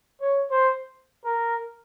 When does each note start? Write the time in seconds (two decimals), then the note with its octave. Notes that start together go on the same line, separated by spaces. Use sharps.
0.21 C#5
0.50 C5
1.24 A#4